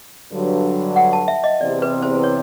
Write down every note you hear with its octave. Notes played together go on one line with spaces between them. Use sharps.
G2 D3 F#3
F#5
A5
E5
D#5
E2 C3 E3 D5
B4
C5
C#5